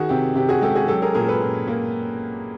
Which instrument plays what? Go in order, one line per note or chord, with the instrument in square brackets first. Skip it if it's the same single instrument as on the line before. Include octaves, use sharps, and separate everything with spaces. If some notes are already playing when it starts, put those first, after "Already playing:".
Already playing: [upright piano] D#3 F#4 G#4
C3 G4
C3 G4
F#4 G#4
G#3 G4 A4
F#4 G#4
F#3 G4 A4
G#4 A#4
A#2 G#4 A#4
A4 B4
A#2
A#3